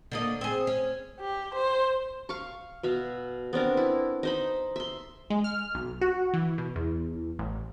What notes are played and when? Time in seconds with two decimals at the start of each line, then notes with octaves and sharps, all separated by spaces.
0.12 D3 A#3 D#5
0.41 C4 G#4
0.67 C#4
1.21 G4
1.55 C5
2.29 F5 C#6
2.83 B2 E5 F5
3.53 B3 C4 D4 A#4
3.77 E4
4.23 D#4 C5 B5
4.76 E5 C6
5.30 G#3
5.44 F6
5.75 B1
6.01 F#4
6.33 E3
6.58 B2
6.76 E2
7.39 A1